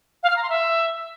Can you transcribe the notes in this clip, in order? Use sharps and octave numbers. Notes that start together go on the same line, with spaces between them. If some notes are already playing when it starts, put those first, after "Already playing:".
F5
F6
A#5
C6
E5